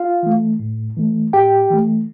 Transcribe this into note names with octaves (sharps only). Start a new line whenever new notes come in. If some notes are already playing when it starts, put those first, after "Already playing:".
Already playing: F4 F5
E3 A3
A2
E3 A3
A2 G4 G5
E3 A3